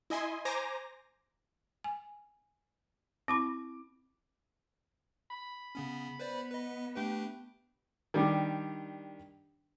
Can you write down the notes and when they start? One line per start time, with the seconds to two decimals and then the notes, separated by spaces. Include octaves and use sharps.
0.10 E4 D#5 G#5 C6
0.45 C5 G#5 A#5 D6 A#6
1.84 G#5
3.28 C4 E4 B5 D6
5.30 B5
5.75 C#3 B3 C#4
6.20 B3 B4 C5 D5
6.51 B4 D#5
6.96 A3 D4 G4 B4
8.14 D#3 G3 D4 G4